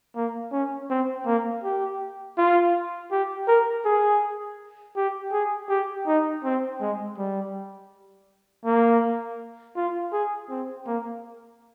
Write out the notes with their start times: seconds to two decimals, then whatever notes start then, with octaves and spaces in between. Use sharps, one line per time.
0.16 A#3
0.52 C#4
0.90 C4
1.26 A#3
1.63 G4
2.38 F4
3.11 G4
3.48 A#4
3.85 G#4
4.96 G4
5.32 G#4
5.69 G4
6.07 D#4
6.44 C4
6.80 G#3
7.18 G3
8.65 A#3
9.76 F4
10.12 G#4
10.50 C4
10.87 A#3